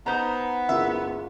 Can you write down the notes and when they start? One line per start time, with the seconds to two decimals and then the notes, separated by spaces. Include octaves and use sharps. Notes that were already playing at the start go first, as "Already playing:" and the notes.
0.06 B3 D#4 C5 A#5
0.69 F#1 G#3 F4 E5